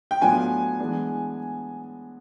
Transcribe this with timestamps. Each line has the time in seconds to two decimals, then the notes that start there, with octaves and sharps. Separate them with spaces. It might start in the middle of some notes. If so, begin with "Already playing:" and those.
0.11 G5
0.21 A2 F#3 B3 D4 F4 G#5
0.80 E3 G#3 B3 D4